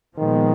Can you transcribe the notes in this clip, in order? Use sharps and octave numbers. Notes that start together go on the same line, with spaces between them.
A#2 D#3 F3 G#3 B3